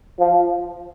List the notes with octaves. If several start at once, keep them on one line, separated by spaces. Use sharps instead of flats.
F3